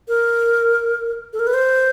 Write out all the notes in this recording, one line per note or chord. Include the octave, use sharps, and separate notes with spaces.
A#4
A4
A#4
B4
C5